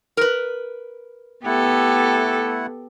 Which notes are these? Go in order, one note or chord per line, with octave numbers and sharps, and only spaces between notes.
A#4 B4
A3 B3 E4 G4 A4 F#5